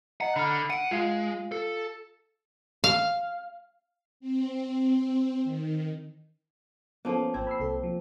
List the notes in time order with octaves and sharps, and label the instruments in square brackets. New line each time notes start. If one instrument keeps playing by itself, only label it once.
[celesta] D#5 A#5 [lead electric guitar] F#5
[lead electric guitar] D3 [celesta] B5 F6
[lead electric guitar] F#5 [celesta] D7 D#7
[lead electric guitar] G#3 [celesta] F4 F5
[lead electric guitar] A4
[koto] F5
[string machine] C4
D#3
[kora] F3 A#3 [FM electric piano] B3 C#4 A4
[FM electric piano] G#1 G#6 [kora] C4
[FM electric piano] B5 E6 C7
C2 A4
F3